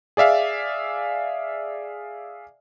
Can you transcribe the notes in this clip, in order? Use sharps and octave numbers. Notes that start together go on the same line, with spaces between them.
G#4 D5 E5 F5